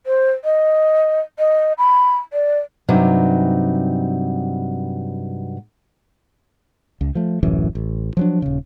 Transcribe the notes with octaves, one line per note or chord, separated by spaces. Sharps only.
C5
D#5
D#5
B5
D5
G2 C3 F#3 D#4
C#2
F3 A3
D1 A1 F#2 E3
A1
F3 F#3 D4
D#1 C#3